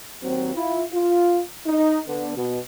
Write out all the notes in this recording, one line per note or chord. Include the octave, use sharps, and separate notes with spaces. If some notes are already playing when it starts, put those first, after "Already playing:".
D#2 F#3 C4
E4 F4
F4
D#4
D3 B3
B2